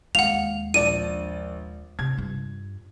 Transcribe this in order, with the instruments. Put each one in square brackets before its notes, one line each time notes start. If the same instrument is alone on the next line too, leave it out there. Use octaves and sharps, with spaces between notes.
[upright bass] D#2 G#3 [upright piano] F5 [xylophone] F#5 F7
[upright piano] A#1 D4 D5 [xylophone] D#7
[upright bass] C3 [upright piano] G#6
[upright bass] G2 F4